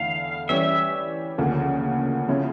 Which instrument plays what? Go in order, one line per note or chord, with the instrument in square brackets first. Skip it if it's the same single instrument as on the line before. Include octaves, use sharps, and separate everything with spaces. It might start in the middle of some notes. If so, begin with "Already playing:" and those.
Already playing: [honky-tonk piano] E2 D3 A3 E4 [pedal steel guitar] F5
[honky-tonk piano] E3 G3 C#4 G4 C#5 [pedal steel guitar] E5
[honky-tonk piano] D2 C#3 F3 A#3
C#3 F3 C#4 E4